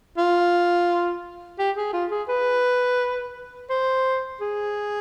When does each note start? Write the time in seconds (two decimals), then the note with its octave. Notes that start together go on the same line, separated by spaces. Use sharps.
0.18 F4
1.59 G4
1.77 G#4
1.93 F4
2.11 G#4
2.29 B4
3.70 C5
4.41 G#4